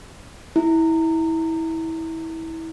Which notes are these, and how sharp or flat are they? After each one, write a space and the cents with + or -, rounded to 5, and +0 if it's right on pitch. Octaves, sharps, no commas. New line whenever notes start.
E4 -25